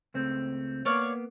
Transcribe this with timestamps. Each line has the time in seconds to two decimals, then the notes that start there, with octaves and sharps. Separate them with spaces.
0.14 C#2 A3 C4
0.85 A#3 B3 C#5 D5 F5